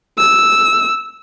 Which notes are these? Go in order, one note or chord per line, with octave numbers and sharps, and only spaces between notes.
E6